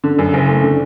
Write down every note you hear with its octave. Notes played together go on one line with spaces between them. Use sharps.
D3
F#2
F#1
A3
D3